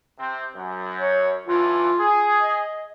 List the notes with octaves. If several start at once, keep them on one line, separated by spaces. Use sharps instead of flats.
C3 C4
F#2
C#5
C#2 D3 E3 F4
G#4
D#5